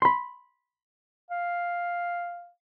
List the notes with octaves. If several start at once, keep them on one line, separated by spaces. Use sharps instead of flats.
B5 C6
F5